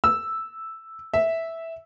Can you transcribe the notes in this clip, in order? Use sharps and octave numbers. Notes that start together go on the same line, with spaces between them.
E6
E5